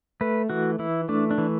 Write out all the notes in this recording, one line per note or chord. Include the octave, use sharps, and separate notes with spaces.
A3 B4
E3 F#4
E3 E4
A3 D4
D4
E3